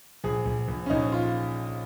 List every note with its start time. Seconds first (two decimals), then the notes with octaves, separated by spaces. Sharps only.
0.24 A#1 G#4
0.45 A#1
0.68 A#1
0.86 C#4
0.90 A#1 D#4
1.12 F4